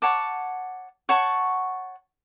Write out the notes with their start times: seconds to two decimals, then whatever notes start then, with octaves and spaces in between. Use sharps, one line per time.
0.02 C#5 F#5 A5 D6
1.09 C#5 F#5 A5 C#6